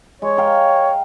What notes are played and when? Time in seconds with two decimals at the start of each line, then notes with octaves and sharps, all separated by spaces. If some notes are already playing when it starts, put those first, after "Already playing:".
0.22 G#3 C#5
0.37 F5 G5 A#5